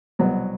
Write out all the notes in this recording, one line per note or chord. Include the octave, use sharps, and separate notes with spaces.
C2 B2 F#3 B3